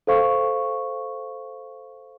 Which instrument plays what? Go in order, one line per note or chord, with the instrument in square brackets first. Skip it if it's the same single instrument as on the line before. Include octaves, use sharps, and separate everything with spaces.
[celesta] A4 C5 F5 C#6